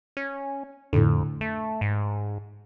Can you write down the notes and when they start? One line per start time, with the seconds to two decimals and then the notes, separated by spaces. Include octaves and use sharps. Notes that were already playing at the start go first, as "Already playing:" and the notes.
0.17 C#4
0.93 F2 A2 D3
1.41 A3
1.81 G#2